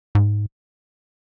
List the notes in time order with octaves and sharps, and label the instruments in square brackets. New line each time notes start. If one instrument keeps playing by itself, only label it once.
[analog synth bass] G#2